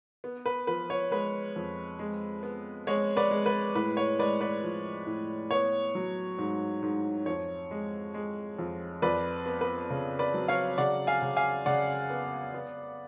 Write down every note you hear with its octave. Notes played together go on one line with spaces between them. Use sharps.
B3
B4
F3 B4
C#5
G#3 B4
F2
G#3
B3
G#3 C#5
B4 D5
G#3
B4
A2 B4
C#5
G#3 B4 D5
B4 D5
F3
A2
B3 C#5
F#3
G#2
G#2
F2 C#5
G#3
G#3
F2
F2 B4 D5
B3
B4
C#3
B4 D5
F#3
C#5 F5
C#3 D5 F#5
F5 G#5
C#3
F5 G#5
C#3 D5 F#5
B3
B3